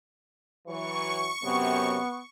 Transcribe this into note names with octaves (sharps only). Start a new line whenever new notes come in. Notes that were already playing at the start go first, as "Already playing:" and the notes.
E3 F#3 C#6
F#2 C3 F#3 B3